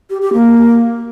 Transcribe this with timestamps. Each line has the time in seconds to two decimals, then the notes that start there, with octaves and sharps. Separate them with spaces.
0.10 G4
0.22 G4
0.33 A#3